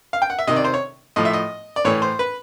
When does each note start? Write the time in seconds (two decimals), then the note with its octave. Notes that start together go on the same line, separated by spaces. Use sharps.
0.13 F5
0.22 G5
0.30 F#5
0.39 E5
0.47 C3 D#3 D#5
0.56 D5
0.64 C5
0.74 C#5
1.16 A2 F3 D#5
1.25 E5
1.33 D#5
1.76 D5
1.85 A2 E3 C#5
2.02 C5
2.19 B4